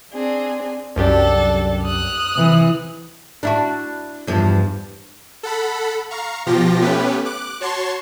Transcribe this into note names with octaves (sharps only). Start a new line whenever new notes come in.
C4 D4 G#4
C2 F#2 D4 G4 A4
D#6 F6 F#6
C3 E3
D4 E4 F#4
E2 G2 F3
A4 F#5 B5
F5 A#5 C#6
B2 F3 F4 G4 A#6
A3 B3 C#4 G4 B4
D6 F#6
F#4 C#5 A5 C6 C#6